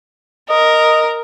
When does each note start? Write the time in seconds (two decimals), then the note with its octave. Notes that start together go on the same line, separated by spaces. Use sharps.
0.49 A#4 D#5